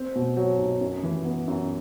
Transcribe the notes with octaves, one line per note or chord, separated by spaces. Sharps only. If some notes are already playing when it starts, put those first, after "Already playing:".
Already playing: C4
B2
F#3
B1
F#2
E3
B3
F#2